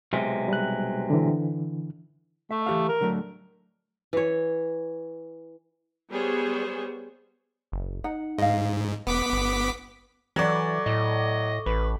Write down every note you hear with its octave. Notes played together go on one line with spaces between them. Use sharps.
B1 C3 G#3
G3 F#6
D3 E3
A3 E5
E3 G4 F5
A#4
D3 F#3 A3
E3 C#5
G3 B3 G#4 C5 C#5
F#1
D#4 F#5
G#2 D#5 F5
E1 B3 D6 B6
G1
E3 F#3 A4 D5 C#6 D6
A2 D#5
A1 B4